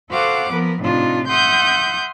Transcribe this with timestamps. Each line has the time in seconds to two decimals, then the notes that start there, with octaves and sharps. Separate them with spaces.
0.11 F#4 A4 C5 F5 F#5 D6
0.53 F3 B3 A#4 B4
0.82 A2 C3 D4 D#4 F4
1.29 E5 F#5 C6 D#6 G6